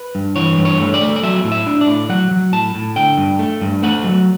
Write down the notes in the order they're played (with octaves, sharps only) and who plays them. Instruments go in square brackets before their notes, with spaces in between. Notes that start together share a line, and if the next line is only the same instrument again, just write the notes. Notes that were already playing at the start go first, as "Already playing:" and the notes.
Already playing: [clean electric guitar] B4
G2
E3 C#5
G2
C#5
A3
D5
A3
D5
F#3 E5
A2
E5
D4
D5
A2
F#3 F#5
F#3
A2 A5
A2
D3 G5
G2
A3
G2
A3 F#5
F#3